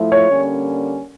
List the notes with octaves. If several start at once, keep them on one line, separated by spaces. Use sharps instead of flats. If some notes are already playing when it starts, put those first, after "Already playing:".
Already playing: F3 A3 E4
C#5
D3 G3 A#3 C#4